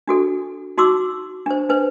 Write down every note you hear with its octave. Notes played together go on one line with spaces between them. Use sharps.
D4 F#4 A4
D#4 F#4 C6 D6 E6
D4 C5
D4 B4 C5